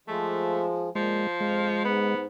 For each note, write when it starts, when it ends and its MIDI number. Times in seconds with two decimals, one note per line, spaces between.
0.08 0.89 53
0.08 0.89 56
0.08 0.67 57
0.95 1.23 46
0.95 1.84 53
0.95 1.27 56
1.40 1.68 41
1.40 2.15 56
1.40 1.68 77
1.84 2.26 44
1.84 2.23 59